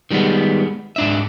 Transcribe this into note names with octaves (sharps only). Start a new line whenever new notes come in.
D#3 G3 G#3 B3
G#2 D4 E5